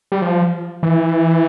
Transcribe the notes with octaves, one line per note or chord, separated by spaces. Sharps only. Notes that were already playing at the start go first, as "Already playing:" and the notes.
G3
F3
E3